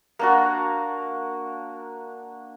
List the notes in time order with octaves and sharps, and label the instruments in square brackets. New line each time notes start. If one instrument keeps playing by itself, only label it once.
[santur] A#3 D4 F#4